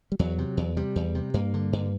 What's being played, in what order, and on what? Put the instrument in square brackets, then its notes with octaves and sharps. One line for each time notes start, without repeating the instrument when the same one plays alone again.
[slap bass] G3
E2 F#3
C3
E2
C3 G3
E2
C3
G2 A#3
D3
G2